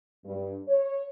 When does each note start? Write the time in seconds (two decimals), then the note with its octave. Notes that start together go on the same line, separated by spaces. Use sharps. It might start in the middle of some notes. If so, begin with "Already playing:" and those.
0.25 G2
0.68 C#5